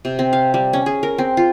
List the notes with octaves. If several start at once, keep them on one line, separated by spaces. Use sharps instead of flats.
C3
C4
F5
G3
C#4
G#4
A#4
C4
F4